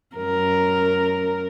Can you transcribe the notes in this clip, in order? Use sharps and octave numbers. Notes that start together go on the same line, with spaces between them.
F#2 A#4